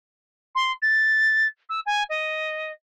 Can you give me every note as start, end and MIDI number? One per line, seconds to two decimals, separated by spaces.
0.55 0.72 84
0.82 1.47 93
1.69 1.80 88
1.86 2.03 80
2.09 2.71 75